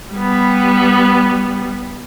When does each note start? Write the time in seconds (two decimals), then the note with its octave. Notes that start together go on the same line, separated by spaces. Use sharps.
0.13 G3 B3